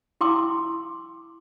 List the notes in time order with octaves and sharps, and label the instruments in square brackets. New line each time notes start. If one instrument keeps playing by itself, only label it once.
[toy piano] E4 G5 C6 D6 E6